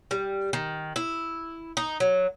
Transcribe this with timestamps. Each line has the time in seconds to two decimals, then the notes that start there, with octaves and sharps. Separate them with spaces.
0.11 G3
0.53 D#3
0.96 E4
1.77 D#4
2.00 F#3